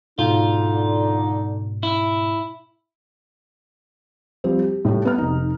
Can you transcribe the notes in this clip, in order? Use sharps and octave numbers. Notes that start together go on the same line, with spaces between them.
G#2 B2 D3 D#4 F4
E4
F3 G3 C4
G4
A2 G3 A3
B3 F6
F1 D#4